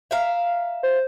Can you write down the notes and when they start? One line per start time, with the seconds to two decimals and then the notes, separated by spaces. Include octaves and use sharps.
0.11 E5 F5 A#5
0.83 C5